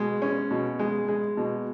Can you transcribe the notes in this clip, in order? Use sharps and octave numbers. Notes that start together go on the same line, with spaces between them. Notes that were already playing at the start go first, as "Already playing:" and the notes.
Already playing: B2 G#3
C#4
B2
G#3
G#3
B2